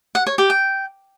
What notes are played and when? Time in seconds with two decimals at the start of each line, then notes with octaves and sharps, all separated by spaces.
0.15 F#5
0.27 C#5
0.38 G4
0.50 G5